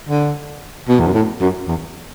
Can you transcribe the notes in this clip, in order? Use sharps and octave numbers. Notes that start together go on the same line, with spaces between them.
D3
B2
E2
F#2
A2
F#2
E2